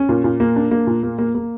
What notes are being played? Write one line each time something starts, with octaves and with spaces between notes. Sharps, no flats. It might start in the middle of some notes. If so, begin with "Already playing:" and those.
Already playing: C#4
A#2
A#2
A#3
D4
A#3
A#2
A#3
A#3
A#3